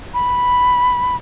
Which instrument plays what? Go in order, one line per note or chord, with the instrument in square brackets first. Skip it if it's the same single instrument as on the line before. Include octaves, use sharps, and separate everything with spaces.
[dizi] B5